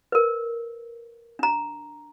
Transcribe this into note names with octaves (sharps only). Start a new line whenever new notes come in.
A#4 B4
D4 A#5